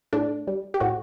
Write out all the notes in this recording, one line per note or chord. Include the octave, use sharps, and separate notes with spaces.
A2 D4
G3
G4
A2 F#4